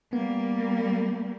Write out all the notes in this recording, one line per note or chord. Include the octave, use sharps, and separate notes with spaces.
G3 A#3 B3